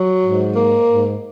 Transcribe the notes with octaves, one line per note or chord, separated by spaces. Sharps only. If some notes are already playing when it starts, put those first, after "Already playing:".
Already playing: F#3
G#2
A#3
G#2